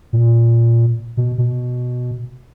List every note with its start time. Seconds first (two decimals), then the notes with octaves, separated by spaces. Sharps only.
0.13 A#2
1.17 B2
1.38 B2